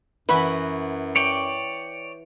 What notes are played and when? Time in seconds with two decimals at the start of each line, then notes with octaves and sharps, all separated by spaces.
0.29 F#2 E3 E4 F#4 B4
1.16 C#5 D5 G5